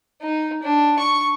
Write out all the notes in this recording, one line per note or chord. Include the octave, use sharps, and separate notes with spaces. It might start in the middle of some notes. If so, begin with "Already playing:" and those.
D#4
D4
C#6